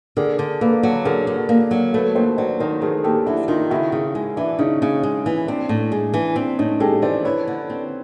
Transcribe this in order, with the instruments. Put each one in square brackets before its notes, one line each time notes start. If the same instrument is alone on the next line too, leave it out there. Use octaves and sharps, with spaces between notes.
[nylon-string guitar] D3 [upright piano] G#4 A#4
[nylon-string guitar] D3
[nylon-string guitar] A#3 [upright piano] A4 B4
[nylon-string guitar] F#3
[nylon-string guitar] D3 [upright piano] G#4 A#4
[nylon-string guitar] D3
A#3
F#3
[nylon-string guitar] A3 [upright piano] A4 B4
[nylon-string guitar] D#2 [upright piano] A#4 C5
[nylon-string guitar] F#3 [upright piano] C5 D5
[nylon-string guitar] D#3 [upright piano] A#4 C5
[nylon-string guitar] A3 [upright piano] G#4 A#4
[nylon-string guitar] D#2 [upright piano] G4 A4
[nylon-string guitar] F#3 [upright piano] D4 E4
[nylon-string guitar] D#3 [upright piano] D#4 F4
[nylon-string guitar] C#3 [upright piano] E4 F#4
[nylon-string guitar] C#3
G#3
[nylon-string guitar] E3 [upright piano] D4 E4
[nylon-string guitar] C#3 [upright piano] C#4 D#4
[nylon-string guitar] C#3
G#3
E3
[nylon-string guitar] C4 [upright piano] D4
[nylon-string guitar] A2
G#3
E3
[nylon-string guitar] C4 [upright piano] D4
[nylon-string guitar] A2 [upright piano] C#4 D#4
[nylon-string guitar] G#3 [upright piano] G4 A4
[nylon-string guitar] E3 [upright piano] C5 D5
[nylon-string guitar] E4 [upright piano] B4 C#5
[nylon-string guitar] D3
C4